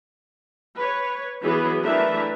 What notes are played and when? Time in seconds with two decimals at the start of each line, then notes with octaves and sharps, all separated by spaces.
0.76 B4 C#5
1.42 E3 F#3 B3 G#4 B4
1.83 E3 A3 D4 A#4 B4 E5